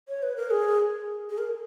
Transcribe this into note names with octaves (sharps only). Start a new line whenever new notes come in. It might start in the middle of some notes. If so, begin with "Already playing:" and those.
C#5
B4
A#4
G#4
G#4
A#4